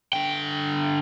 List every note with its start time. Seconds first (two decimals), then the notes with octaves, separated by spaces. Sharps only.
0.13 D3 G5